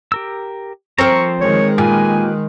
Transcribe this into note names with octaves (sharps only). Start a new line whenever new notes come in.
G4 A#4 E6
F3 C4 A#4 C5 A#5 C#6
D#3 G#3 C#5
A#2 G4 B4 G#5